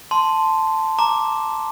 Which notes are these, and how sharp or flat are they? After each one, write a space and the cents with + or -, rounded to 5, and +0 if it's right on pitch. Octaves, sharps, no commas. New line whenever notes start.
A5 +0 C6 -5
A#5 +0 D6 +0